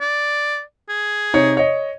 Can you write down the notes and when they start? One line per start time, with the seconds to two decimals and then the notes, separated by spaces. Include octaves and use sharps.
0.01 D5
0.89 G#4
1.34 C3 D#4 C#5
1.57 C#5 D#5